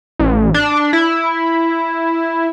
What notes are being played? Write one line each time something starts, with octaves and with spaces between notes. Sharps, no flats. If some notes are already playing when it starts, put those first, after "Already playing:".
A1
D4
E4